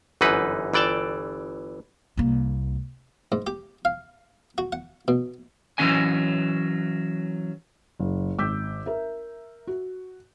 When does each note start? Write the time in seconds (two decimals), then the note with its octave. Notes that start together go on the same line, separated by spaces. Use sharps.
0.21 G1 F#2 E3 D#4 B4
0.73 G1 E3 D5 G5 A5
2.17 C2 A#3
3.32 G#2
3.47 G4
3.85 F5
4.58 F#4
4.72 F#5
5.08 B2
5.78 E3 F#3 G#3 C#4 D#5 G#5
8.00 F#1
8.38 G#1 D6 E6 G6 B6
8.86 A#4 E5
9.67 F#4